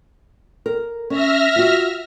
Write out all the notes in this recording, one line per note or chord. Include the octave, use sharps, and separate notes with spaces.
A#4
C#4 E5 F6 A#6
F4 F#4